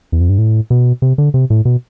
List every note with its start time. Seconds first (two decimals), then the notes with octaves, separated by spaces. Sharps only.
0.12 E2
0.20 F2
0.29 G2
0.38 A2
0.70 B2
1.02 C3
1.18 D3
1.34 C3
1.50 A2
1.65 B2